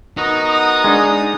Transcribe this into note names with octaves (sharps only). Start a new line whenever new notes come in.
B3 D#4 F#4 A#4
D#6
G#3 D4